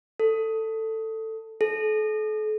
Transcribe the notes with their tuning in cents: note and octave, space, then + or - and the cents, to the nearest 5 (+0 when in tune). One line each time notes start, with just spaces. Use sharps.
A4 +15
A4 -40